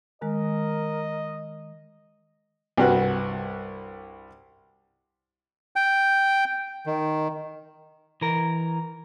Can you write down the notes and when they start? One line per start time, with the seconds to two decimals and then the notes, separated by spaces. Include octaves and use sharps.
0.22 D#3 G#3 A#4 D#5
2.77 C2 G2 F#4 B4
5.76 G5
6.86 D#3
8.21 E3 A#4